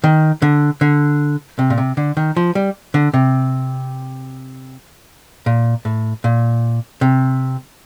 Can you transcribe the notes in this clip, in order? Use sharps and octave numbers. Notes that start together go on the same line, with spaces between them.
D#3
D3
D3
C3
A#2
C3
D3
D#3
F3
G3
D3
C3
A#2
A2
A#2
C3